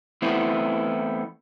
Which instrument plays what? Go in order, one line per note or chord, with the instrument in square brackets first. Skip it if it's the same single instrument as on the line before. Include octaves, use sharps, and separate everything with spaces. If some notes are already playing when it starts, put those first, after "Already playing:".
[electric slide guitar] E3 A3 B3 C4 E4